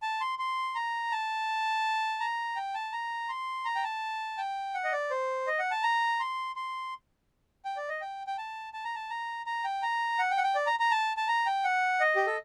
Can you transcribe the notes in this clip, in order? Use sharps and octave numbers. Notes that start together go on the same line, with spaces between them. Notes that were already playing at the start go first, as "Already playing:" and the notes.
A5
C6
C6
A#5
A5
A#5
G5
A5
A#5
C6
A#5
G5
A5
G5
F#5
D#5
D5
C5
D#5
F#5
A5
A#5
C6
C6
G5
D5
D#5
G5
G5
A5
A5
A#5
A5
A#5
A#5
G5
A#5
F#5
G5
F#5
G5
D5
A#5
A#5
A5
A5
A#5
G5
F#5
D#5
G4
A4